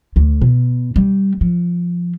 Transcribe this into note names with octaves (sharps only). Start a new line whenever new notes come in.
D2
B2
G3
F3